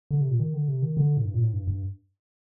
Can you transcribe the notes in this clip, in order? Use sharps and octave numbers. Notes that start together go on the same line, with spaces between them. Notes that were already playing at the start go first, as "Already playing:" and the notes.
D3
C3
A#2
D#3
D3
C3
D#3
D3
A2
G2
A#2
A2
G2
G2